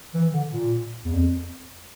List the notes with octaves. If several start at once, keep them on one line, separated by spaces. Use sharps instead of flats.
E3
D3
A#2
E2
F2